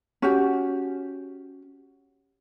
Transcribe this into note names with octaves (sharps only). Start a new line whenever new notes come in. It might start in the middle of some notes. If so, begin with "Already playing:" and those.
C#4 F#4 G4